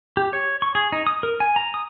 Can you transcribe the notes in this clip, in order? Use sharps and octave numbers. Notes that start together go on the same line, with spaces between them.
G4
C#5
C#6
G#4
D#4
D#6
A#4
G#5
A#5
D#6